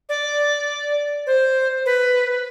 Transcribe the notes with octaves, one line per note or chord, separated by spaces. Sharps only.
D5
C5
B4